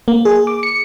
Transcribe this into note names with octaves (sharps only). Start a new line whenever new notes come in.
A#3
G#4
D6
C#7